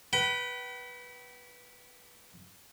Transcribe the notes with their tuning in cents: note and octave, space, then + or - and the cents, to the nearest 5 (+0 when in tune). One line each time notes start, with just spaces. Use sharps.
B4 -10 G5 -45